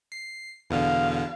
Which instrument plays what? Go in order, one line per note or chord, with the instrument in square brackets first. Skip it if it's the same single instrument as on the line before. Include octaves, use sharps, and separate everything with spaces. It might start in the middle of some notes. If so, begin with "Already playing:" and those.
[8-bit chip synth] C7
[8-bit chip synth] E2 B2 D3 [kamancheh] F5